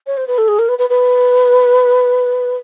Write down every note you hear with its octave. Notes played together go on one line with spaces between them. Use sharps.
C#5
C5
B4
A4
G#4
A#4
B4
B4
B4